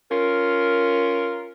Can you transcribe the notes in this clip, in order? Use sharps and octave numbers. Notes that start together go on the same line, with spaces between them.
C#4 F4 A#4